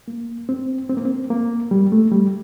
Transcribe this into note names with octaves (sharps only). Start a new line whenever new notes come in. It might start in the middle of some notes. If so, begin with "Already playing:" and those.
A#3
C4
C4
A#3
C4
A#3
G3
A3
G3